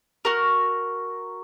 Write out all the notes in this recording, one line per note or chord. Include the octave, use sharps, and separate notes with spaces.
F#4 A#4